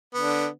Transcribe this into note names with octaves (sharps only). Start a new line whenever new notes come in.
D3 B3 D4